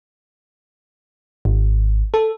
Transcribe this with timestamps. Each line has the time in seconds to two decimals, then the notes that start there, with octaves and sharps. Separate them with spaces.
1.45 G#1
2.14 A4